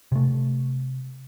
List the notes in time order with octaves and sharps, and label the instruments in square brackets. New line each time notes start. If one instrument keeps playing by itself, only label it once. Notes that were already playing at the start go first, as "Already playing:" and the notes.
[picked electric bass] C3 A3